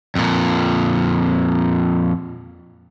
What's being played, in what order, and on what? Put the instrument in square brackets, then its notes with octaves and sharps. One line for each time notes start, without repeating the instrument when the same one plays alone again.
[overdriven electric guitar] F2 A#2